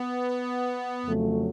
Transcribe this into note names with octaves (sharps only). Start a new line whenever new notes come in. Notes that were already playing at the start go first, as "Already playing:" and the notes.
Already playing: B3
F2 C#3 F#3 A3